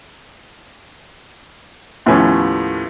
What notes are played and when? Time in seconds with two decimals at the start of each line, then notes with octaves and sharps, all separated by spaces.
2.06 D#2 A2 F3 A3 B3 C#4